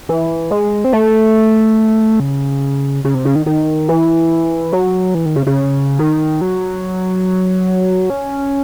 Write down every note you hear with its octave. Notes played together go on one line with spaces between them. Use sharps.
E3
G#3
C4
A3
C#3
C#3
C3
C#3
D#3
D#3
E3
F#3
E3
D#3
C#3
C#3
D#3
F#3
C#4